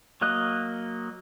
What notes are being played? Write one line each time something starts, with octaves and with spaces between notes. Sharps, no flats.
F#3 A#3 D#5 F#6